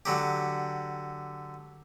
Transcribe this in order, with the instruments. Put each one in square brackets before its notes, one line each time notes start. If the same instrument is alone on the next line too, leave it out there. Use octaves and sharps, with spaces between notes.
[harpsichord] D3 F#3 G4